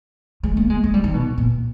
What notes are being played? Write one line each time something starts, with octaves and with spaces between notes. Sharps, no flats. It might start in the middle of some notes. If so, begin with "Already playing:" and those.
G#3
A#3
G#3
G#3
G3
D#3
B2
A#2